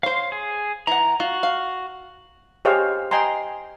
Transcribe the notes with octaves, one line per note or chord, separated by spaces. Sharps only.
C5 C#5 F5 C6
G#4
E3 F#5 A#5
F4 F#4
F5
G4 G#4 C5 C#5 D#5 F5
D#5 G5 G#5 A#5 C6